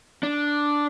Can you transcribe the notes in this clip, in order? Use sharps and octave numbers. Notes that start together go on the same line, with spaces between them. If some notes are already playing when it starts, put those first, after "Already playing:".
D4